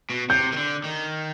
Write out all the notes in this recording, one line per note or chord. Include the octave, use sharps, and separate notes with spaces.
B2
C3 G6
D#3
D3
D#3